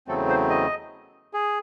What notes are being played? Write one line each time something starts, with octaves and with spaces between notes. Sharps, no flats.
E2 C#3 F#3 A3 C4 A4
C5
D#5
G#4